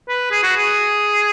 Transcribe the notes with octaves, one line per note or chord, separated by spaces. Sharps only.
B4
G#4
F#4
G#4